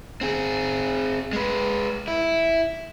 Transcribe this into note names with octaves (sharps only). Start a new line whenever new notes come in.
C4 G#4
G#3 B4
E4